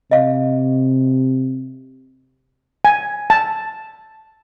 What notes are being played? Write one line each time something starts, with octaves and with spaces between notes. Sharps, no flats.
C3 D#5 F5
G#5
A5